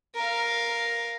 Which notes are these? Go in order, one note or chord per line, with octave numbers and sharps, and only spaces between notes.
A#4 F5